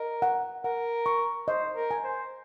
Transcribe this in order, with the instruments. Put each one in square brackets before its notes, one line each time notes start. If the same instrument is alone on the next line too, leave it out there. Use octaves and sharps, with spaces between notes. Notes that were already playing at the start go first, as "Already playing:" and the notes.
Already playing: [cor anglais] A#4 [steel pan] D#5
[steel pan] F#5
[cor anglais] A#4 [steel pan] F#5
[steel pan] C#6
[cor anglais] C5 [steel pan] D#5
[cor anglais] A#4
[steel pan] G#5
[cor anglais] C5